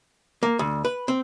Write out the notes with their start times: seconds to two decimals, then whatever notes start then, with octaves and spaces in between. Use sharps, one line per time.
0.43 A#3
0.59 D2
0.85 B4
1.08 C4